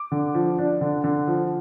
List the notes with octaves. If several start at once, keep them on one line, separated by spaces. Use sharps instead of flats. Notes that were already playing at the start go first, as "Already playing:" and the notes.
Already playing: D6
D3
F3
D4
D3
D3
F3